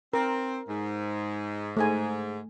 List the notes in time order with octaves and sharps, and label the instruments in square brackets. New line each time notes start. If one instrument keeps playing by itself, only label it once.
[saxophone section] C4 [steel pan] A#4
[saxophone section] G#2
[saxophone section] G#2 [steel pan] A3 G#5